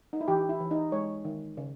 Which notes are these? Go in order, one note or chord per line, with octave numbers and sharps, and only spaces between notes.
D#4
E4
E3 G4
E4
E3
D#4
G#3 C#5
D#3
C#3